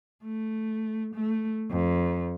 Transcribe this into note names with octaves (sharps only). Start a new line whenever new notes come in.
A3
A3
F2